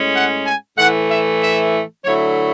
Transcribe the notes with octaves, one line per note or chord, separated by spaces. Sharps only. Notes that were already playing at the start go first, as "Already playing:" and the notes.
Already playing: A2 G#3 C#4
F#5
G#5
A2 E3 A3 F#5
E5
E5
D3 F#3 A3 E4 C#5